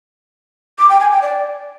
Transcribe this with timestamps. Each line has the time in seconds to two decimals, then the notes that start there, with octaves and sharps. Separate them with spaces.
0.78 D6
0.89 G5
1.00 G#5
1.11 G5
1.22 D5